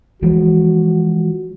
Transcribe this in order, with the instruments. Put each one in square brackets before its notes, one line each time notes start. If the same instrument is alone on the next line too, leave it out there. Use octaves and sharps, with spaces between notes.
[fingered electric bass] E3 F3 G#3 [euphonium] F#4